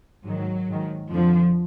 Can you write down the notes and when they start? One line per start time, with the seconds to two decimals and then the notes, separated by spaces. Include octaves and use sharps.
0.24 G#2 D#3 F#3
0.68 G#2 D#3
1.10 F2 D3 F3